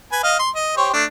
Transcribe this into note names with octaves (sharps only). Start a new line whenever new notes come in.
B4 G#5
D#5 F5
C6
D#5
G4 C5 C#5
A3 D4